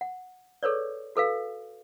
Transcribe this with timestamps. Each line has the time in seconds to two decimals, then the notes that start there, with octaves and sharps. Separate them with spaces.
0.01 F#5
0.63 G#4 A4 B4 C#5 D5
1.16 F#4 A4 B4 F5